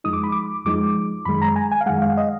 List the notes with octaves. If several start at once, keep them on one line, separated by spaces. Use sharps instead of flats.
F2 F3 G#3 D#4 D#6
D6
B5
D6
F2 F3 G#3 D#4 D6
F#2 D#3 G#3 B5
A#5
G#5
G#5
F5
F#2 D#3 G#3 F#5
F5
D#5